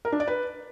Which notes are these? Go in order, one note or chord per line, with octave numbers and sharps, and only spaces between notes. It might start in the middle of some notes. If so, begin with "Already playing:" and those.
A#4
D4
D5
B4